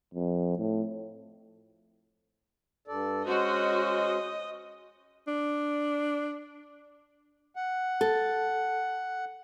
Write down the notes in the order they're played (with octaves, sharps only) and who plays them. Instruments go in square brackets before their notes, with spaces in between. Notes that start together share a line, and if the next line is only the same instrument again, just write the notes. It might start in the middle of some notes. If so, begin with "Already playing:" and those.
[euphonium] F2
A2
[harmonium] G2 A4 D5
[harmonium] G#3 C#4 C5 [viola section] F#4 [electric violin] D#5
[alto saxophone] D4
[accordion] F#5
[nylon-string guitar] A4